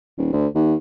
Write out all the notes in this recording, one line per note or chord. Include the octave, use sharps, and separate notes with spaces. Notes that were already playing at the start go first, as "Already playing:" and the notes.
D#1
D2
D#2